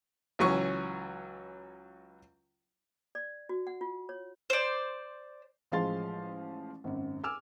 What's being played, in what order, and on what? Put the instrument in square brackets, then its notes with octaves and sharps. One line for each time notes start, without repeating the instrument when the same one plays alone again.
[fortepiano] C#2 E3 F#3 C#4 C#6
[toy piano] D5
F#4
F#5
F4
C#5
[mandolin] C5 D5
[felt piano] A1 F3 G#3 F5 C6 A6
G#1 F#2
G#5 D6 E6 F6